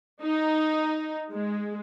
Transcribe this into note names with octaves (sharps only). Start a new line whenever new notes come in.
D#4
G#3